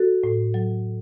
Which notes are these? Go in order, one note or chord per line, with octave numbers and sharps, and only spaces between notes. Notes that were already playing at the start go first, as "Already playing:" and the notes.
Already playing: F#4 A4
A2
F#3